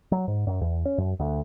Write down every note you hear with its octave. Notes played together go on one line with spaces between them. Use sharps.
F#3
G#2
F#2
E2
C#4
F#2
D2